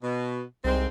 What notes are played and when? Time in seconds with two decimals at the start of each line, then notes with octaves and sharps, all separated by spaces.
0.03 B2
0.65 C2 G#2 G#3 C4